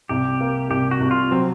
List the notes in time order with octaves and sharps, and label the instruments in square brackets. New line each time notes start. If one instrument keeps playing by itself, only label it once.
[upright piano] C2 [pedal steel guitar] G4
[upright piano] A#3
[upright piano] C2 [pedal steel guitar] G4
[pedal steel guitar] F#4
[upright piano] C2
[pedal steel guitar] F4
[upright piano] F#3 [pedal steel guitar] C4